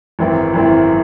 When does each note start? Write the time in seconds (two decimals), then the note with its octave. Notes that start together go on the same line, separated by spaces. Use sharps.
0.19 G#1 F#2 E3 C4 E4
0.54 G#1 F#2 E3 C4 E4